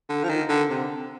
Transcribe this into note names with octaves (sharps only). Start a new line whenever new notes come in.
D3
F3
D#3
D3
C3